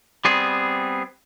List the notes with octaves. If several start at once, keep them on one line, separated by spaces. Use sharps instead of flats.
G3 B3 C4 G#4